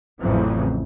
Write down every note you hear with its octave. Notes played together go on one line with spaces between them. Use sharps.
A1 F2 C#3 E3 F#3 C4